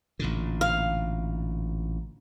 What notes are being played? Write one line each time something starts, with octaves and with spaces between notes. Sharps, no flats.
A1 A#2 D3
F5